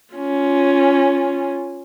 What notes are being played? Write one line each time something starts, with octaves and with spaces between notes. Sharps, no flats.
C#4 F4